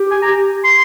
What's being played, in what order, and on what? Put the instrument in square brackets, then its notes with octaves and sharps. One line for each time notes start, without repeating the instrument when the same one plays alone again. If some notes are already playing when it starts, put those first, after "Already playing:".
Already playing: [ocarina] G4
[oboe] G#5
A#5
C6